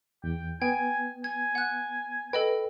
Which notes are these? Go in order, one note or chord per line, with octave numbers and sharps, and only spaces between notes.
E2 G5
B3 G5 G#5
G#5 G#6
F#5 F#6
A4 B4 D#5 G5